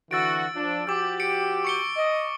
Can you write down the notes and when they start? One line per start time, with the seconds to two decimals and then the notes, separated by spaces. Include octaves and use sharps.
0.11 D3 E3 F#4 E6 A6 D7
0.54 F3 D4
0.87 F3 F#4 G4 D6 E6
1.20 C#7 D7
1.65 C#6 C#7 G7
1.97 D#5